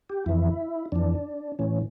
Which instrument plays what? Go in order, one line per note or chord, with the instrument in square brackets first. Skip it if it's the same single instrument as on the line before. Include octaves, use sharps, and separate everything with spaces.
[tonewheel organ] G4
F2 E3 E4
F2 E3 D4
A2 E3 C#4